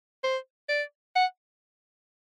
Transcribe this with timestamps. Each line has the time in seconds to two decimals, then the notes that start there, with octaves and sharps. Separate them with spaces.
0.24 C5
0.69 D5
1.16 F#5